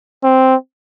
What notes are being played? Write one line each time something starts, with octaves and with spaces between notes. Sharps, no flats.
C4